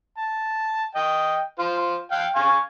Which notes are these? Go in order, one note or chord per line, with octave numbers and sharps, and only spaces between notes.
A5
D#5 G5
F4 C5
F5 G5
F5 G#5 C#6